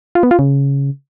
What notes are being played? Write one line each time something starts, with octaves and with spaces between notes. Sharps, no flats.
F4
B3
F4
C#3